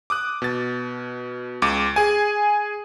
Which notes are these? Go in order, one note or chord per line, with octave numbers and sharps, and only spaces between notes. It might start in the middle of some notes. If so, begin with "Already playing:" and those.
D6 D#6 F#6
B2 A6
C#2 D6
G#4 G#5